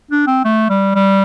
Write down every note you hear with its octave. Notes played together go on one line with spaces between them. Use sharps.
D4
C4
A3
G3
G3